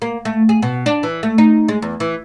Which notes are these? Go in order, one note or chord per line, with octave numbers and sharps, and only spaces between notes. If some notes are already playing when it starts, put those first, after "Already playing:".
A#3
A3
G#4
B2
D4
E3
A3
D#4
G#3
E2
E3